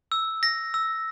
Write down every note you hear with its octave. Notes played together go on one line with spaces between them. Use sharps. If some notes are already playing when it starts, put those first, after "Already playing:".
E6
A#6
E6